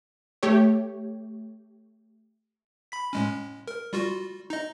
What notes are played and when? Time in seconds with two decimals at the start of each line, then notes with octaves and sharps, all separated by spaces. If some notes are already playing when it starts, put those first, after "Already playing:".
0.43 A3 G4 C#5
2.92 B5 B6
3.13 A2 G#3 C#4
3.68 A#4
3.93 G3 F4 F#4
4.50 D#4 D#5